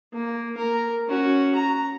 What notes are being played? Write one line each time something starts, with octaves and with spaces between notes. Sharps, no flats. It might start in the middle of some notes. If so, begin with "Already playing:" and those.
A#3
A#4
C#4 F#4
A#5